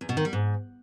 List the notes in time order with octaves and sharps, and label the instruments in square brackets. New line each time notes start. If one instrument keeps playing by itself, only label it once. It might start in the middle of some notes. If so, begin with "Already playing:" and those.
[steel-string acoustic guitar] E2
B2
D#3
G3
G#2